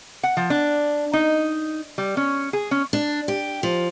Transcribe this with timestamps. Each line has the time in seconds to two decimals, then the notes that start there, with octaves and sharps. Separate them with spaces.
0.23 F#5
0.37 F3
0.50 D4
1.13 D#4
1.98 G3
2.17 C#4
2.53 G#4
2.71 C#4
2.93 D4
3.28 G4
3.63 F3